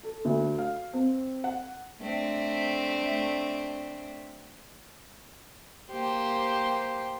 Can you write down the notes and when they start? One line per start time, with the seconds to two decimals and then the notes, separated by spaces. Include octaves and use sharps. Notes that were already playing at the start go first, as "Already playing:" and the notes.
0.03 A4
0.25 D2
0.58 F5
0.93 C4
1.44 F#5
2.01 A3 C4 D4
5.92 A#3 G4 C5